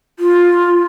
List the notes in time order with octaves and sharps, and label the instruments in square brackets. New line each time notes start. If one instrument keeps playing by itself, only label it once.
[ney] F4